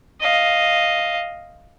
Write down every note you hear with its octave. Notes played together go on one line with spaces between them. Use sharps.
D#5 F5